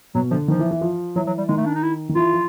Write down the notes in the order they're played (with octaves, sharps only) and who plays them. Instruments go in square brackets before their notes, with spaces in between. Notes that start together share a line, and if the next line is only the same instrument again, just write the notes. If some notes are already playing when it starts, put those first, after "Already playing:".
[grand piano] B2 [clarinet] F#3
[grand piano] D3 [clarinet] F3
[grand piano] D#3 [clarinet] F3
[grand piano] E3
E3
F3
[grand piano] E3 [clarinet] F#3
[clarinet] F#3
G3
[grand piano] D#3 [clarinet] G#3
[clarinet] A3
D4
D#4
E4
[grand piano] D#3
[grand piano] E3 [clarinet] F4
[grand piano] F3